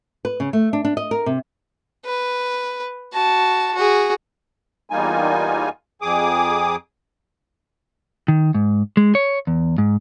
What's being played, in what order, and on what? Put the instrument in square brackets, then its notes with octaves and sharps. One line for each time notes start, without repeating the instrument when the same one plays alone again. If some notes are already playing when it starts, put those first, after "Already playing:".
[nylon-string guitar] B4
C#3
A3
D4
D4
D#5
A#4
C3
[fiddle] B4
F#4 A5
F#4 G#4
[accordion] E2 G3 A#3 D#4 F4 G#5
F2 G#4 D6 D#6
[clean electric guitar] D#3
G#2
G#3
C#5
E2
G#2